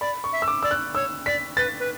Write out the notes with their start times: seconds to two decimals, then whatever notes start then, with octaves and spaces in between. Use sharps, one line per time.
0.01 D5 B5
0.24 C#6
0.33 E5
0.42 E6
0.48 D6
0.63 D5 E6
0.71 F#6
0.95 C#5 E6
1.26 D5 B6
1.57 B4 A6
1.80 B4